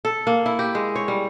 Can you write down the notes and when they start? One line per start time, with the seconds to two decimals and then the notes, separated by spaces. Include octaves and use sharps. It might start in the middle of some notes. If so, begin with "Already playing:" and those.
0.05 A4
0.27 A#3
0.46 E4
0.59 G4
0.75 G#3
0.96 C#5
1.08 G3